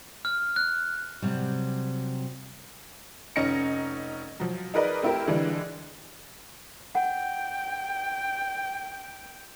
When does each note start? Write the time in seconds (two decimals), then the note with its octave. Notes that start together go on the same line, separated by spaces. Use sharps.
0.25 F6
0.56 F#6
1.22 C3 F#3 G3
3.36 F1 C#4 D#4 A#6 C#7
4.40 F3 F#3
4.74 D#4 G#4 A#4 B4 D5 D#5
5.03 A3 C4 E4 G4 A#4
5.27 D3 E3 G3 G#3 D4 G#4
6.95 F#5 G5